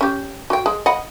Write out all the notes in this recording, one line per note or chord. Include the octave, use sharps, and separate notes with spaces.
C#4 G4
F#4 G5
G#3
D#5 F#5 B5